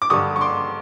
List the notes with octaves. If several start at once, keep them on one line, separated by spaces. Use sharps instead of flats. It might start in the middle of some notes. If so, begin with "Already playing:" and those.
D6
G2 D3 G3 C#6 D#6
C#6
C6 D6